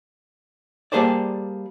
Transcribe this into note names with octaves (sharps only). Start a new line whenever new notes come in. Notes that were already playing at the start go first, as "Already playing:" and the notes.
G3 A#3 G#4 A4 C5 D5